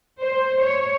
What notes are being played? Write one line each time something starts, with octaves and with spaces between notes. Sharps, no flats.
C5
C#5